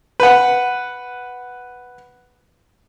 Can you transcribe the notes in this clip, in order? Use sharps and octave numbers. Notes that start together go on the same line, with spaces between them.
B4 F#5